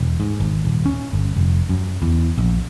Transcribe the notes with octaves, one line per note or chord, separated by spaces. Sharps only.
E1
G#2
G#1
D#1
C#4
G1
F1
F#2
E2
A#1